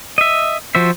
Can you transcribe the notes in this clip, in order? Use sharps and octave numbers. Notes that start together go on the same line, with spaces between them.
D#5 E5
F3 F#4 C5 E5